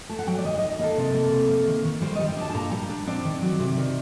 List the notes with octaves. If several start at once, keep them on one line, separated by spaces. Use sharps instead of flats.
A3 A5
F#5
F#3 G5
D5
D#3 D#5
D#4 D#5
A#3 A4
C3
A#3
C3
A#3
D#3
D#3
G3 C5
D#5
G3
G5
D4 A5
A5
A#2 A#5
G3
D4
C4 D5
D#3
F#3
C3
D#3